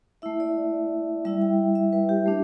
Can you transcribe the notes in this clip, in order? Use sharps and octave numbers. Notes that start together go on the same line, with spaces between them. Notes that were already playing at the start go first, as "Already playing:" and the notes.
A3 E4 E5
D5
G3 E4 E5
G5
E5
B4
G4
A3 D4